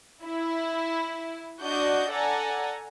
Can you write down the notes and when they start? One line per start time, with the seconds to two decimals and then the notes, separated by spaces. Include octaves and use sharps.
0.23 E4
1.62 D4 F#4 D5 D#5 F#5 G6
2.11 A4 D5 F#5 G#5 A#5